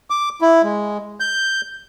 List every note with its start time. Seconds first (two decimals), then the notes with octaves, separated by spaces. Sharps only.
0.10 D6
0.41 E4
0.63 G#3
1.20 G6